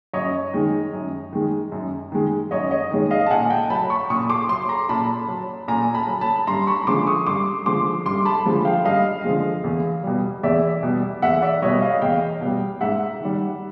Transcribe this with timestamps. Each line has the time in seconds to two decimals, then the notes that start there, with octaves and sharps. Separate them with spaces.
0.13 F#2 C#5 D#5
0.54 D#3 G#3
0.93 F#2
1.33 D#3 G#3
1.72 F#2
2.12 D#3 G#3
2.51 F#2 C#5 D#5
2.71 C#5 D#5
2.91 D#3 G#3
3.11 D#5 F5
3.26 A5
3.30 A#2 F#5 G#5
3.50 G5 A5
3.70 F#3 A5 B5
3.90 B5 C#6
4.10 A#2 C#6 D#6
4.29 C6 D6
4.49 F#3 C6 D6
4.69 A#5 C6
4.89 A#2 A5 B5
5.28 F#3
5.68 A#2 G#5 A#5
5.94 A5 B5
6.07 F#3
6.21 A5 B5
6.47 G2 A#5 C6
6.67 B5 C#6
6.87 D3 F3 G#3 C6 D6
7.07 C#6 D#6
7.27 G2 C6 D6
7.66 D3 F3 G#3 C6 D6
8.06 G2 C6 D6
8.25 A5 B5
8.45 D3 F3 G#3
8.65 F5 G5
8.85 G2 D#5 F5
9.25 D3 F3 G#3
9.64 E2
10.04 B2 G3
10.43 E2 D5 E5
10.83 B2 G3
11.22 E2 E5 F#5
11.42 D5 E5
11.62 B2 G3 C#5 D#5
11.82 D#5 F5
12.02 E2 F5 G5
12.41 B2 G3
12.81 G#2 E5 F#5
13.20 D#3 G3